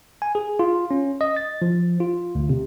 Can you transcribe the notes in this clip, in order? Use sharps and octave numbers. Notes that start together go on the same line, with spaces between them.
G#5
G#4
F4
C#4
D#5
A6
F3
F4
D2
C3